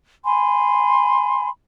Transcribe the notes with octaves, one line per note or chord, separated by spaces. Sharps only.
G#5 B5 C6